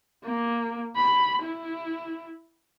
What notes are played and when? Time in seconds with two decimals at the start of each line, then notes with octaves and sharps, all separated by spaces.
0.24 A#3
0.96 B5
1.42 E4